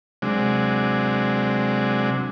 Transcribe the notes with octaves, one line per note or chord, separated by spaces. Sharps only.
C3 F#3 G#3 D4